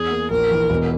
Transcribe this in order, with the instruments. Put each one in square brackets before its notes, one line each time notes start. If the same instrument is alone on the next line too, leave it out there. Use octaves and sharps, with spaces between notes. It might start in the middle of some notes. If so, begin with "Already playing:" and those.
Already playing: [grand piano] E2 [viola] G#4
[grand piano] A#3
[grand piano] A#1 [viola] A#4
[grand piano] E3
E1